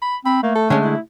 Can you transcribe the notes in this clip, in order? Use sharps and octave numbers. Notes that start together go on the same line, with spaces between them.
B5
C4 B5
A3 A#3
A4
D3 G#3 C#4
E4